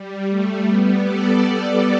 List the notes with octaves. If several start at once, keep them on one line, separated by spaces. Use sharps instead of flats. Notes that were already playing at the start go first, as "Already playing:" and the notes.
Already playing: G3
A3
G3 B3
A4 D5